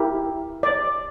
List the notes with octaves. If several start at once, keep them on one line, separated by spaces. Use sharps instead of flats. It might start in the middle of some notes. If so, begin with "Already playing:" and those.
Already playing: E4 G4 A#4
D5